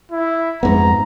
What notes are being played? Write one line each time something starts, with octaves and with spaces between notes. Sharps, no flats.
E4
F2 G#2 B3 A#5